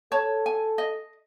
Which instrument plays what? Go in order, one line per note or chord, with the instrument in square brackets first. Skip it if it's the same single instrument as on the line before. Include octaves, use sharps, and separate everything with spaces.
[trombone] A4 [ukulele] C#5 A5
[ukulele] G#5
D#5